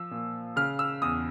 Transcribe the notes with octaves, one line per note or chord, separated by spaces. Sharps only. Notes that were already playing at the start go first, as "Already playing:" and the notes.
Already playing: F3 E6
A#2
C#3 F6
E6
E2 D#6